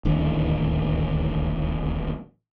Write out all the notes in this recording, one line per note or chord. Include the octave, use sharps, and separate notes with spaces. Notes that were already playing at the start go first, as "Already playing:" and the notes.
D1 A1 D#2 D4